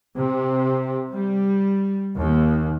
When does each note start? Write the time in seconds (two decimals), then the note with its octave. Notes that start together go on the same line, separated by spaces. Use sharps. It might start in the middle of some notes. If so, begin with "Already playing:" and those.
0.16 C3
1.12 G3
2.16 D#2